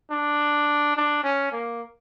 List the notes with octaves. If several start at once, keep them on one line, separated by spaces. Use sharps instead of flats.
D4
D4
C#4
A#3